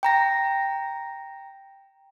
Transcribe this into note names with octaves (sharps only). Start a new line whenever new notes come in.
G5 A#5 A#6